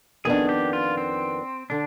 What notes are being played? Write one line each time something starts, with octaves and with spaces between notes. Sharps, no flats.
F2 D#3 B3 D4 G#4
G4
F4
C4
D3 D4